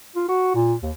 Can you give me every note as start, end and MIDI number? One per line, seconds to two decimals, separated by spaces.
0.16 0.25 65
0.28 0.50 66
0.55 0.74 46
0.83 0.91 39